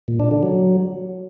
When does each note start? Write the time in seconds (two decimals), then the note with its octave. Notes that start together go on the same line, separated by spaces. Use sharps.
0.08 A#2
0.20 D4
0.31 D3
0.43 F#3